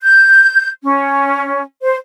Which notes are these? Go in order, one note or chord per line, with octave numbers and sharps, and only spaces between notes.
G6
C#4
C5